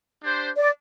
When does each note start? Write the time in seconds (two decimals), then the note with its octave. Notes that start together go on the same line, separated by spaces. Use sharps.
0.22 D4 G4 C5
0.56 D5